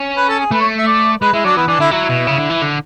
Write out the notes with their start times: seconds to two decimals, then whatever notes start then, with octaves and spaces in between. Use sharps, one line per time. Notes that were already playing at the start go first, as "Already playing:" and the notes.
Already playing: C#4
0.17 B4
0.28 A4
0.40 G#4
0.51 A3 B4
0.60 C#5
0.78 E5
0.87 D5
1.21 G#3 B4
1.33 G#3 E4
1.44 F#3 D4
1.57 E3 B3
1.68 E3 D4
1.80 D3 E4
1.91 F#3 E4
2.09 B2
2.27 C#3
2.38 D3
2.50 E3
2.62 D3